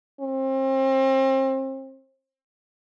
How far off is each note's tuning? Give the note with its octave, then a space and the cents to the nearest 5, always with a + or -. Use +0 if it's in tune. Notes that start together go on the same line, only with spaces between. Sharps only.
C4 +35